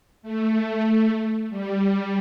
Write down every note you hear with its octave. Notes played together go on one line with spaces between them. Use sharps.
A3
G3